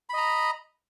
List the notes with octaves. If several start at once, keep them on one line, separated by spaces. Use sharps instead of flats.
D#5 A#5 B5